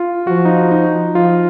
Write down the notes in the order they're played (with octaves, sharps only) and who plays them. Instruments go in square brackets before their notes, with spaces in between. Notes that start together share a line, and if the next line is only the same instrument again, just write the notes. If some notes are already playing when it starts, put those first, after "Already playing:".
Already playing: [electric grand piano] F4
[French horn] F3 [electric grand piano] F#4
[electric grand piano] D#4
F4
D#4
[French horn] F3 [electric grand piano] F4